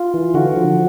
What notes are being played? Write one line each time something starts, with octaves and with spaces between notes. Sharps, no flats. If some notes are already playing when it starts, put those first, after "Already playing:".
Already playing: F4
E3
D3 F#4
F3